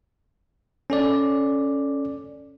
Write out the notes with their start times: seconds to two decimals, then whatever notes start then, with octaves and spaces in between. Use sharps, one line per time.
0.90 C#4 A4 D5